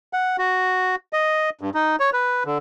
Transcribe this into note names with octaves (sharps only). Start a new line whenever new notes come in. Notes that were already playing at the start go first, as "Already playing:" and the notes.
F#5
F#4
D#5
G2
D#4
C#5
B4
D3